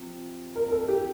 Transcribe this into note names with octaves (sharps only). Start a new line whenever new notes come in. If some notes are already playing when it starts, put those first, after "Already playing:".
Already playing: C3 F3
A#4
A#4
A4
G4